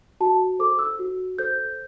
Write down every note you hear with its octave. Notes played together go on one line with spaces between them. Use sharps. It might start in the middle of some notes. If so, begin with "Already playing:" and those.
F#4 A5
A4 C5 D6
E6
F#4
A4 C5 G6